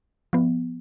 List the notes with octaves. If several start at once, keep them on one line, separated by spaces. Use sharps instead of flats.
F3 B3